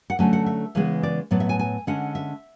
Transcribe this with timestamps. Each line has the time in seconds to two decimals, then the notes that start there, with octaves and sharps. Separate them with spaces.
0.10 F#5
0.19 D3 F#3 A3 C#4 G#5
0.33 F#5
0.46 E5
0.75 C#3 E3 G#3 B3
1.03 D5
1.31 A2 F#3 B3 D5
1.40 E5
1.49 G#5
1.59 G#5
1.87 D3 G#3 C#4 F#5
2.15 E5